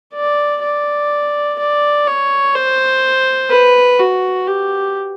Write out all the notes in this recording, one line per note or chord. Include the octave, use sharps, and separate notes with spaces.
D5
D5
D5
C#5
C5
B4
F#4
G4